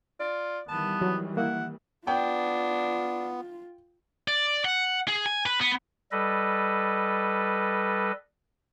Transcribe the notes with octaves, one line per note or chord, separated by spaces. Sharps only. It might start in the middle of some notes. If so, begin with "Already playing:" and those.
F4 D5
D#3 E3 G3 B3 A5
F#3
A#3 E4 F#5
B3 D4 F4 G5
D5
F#5
G#4
G#5
B4
B3
G3 A4 B4 D#5